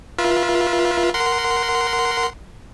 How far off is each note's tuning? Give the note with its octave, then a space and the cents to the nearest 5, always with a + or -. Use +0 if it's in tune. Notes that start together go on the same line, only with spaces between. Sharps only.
F4 +0 B4 -40 E5 +5
A#4 +0 F#5 +0 C6 -15